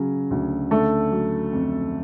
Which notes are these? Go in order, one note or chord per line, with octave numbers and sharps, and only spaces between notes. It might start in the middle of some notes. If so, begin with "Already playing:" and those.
Already playing: C#3 F#3
D2
D3 A3 A4
F#3
F2